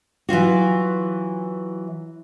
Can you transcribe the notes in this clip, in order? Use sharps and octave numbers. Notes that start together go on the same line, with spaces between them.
E3 F#3 F4 F#4